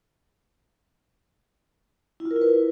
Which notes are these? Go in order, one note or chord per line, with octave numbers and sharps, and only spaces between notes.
E4
F4
A#4
E4
B4